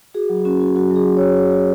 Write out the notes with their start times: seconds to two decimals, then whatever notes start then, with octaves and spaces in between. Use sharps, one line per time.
0.14 F#4 G#4
0.29 F#3
0.45 C#4 F#4
0.61 F#4
0.76 F#3 F#4
0.91 F#3 G#4
1.07 F#3
1.17 F#3 C#5
1.37 F#4
1.53 F#4